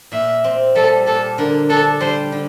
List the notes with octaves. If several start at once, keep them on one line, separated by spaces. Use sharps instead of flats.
A#2 E5
C4
G3 A4
A#2 A4
D3 A#4
D4 A4
G3 C5
D3